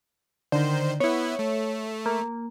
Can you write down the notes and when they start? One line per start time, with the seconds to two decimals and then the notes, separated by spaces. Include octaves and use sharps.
0.52 D3 D#3 C5
1.00 B3 E4 C#5
1.39 A3
2.06 A#3